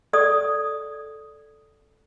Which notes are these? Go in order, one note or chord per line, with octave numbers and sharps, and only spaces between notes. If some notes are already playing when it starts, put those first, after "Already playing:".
A4 D5 D#6